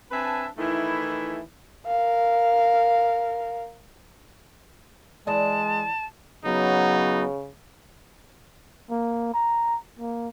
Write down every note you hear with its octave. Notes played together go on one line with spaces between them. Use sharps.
C4 D4 B4 E5 G#5 A5
D#3 E3 A3 E4
A#4 F5
E3 G#3 D5 D#5 A5
C#3 F#3 B3 D#4
A#3
A#5
A#3